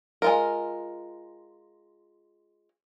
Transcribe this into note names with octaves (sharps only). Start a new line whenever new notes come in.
G#3 F4 A#4